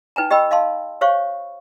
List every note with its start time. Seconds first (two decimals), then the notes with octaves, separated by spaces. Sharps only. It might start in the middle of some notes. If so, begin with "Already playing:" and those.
0.16 D#4 B4 G5 G#5 A#5
0.31 G4 D#5 G5 B5 E6
0.51 D#5 F5 A5 C6
1.01 G4 C5 C#5 F5 C#6